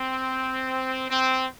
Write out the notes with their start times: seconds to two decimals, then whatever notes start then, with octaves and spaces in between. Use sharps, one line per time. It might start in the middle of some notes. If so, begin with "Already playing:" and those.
Already playing: C4
1.10 C4